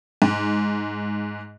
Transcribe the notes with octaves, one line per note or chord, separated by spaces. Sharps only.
G#2